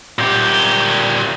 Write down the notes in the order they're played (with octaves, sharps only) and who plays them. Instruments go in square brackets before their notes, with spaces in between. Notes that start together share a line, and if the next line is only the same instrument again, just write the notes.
[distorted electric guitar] A#2 G4